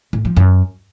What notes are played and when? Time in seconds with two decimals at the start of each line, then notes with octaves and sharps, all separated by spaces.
0.13 A2
0.25 F3
0.37 F#2